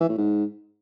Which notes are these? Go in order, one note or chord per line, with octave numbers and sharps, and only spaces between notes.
E3
A2
G#2